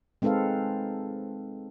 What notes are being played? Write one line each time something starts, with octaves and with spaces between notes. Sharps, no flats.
G#3 C4 D#4 A4 B4 F5